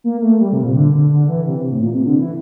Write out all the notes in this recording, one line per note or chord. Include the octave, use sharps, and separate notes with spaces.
A#3
A3
G3
C3
A#2
D3
D3
D3
E3
C3
A2
A#2
C3
D3
E3